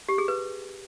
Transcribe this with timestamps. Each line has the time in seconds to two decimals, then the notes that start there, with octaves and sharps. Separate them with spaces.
0.09 G4
0.18 G#4
0.28 B4